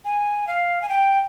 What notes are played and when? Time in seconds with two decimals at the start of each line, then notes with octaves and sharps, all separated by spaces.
0.05 G#5
0.47 F5
0.82 G#5
0.89 G5